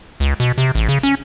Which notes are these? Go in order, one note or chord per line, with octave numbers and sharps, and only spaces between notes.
C#2
B2
C3
A1
C#3
C#4